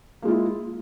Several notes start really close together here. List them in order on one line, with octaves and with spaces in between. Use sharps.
A#3 G#3 F4 E4